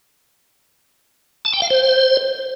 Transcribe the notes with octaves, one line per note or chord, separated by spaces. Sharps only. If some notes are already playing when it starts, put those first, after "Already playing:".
A5
G5
F5
C5